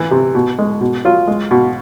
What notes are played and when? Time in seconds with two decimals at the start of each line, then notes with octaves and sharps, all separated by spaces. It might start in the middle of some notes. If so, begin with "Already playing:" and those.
Already playing: E3
0.11 C3
0.35 B2
0.59 G#3
0.81 B2
1.05 F#3 F4
1.27 G#3
1.51 B2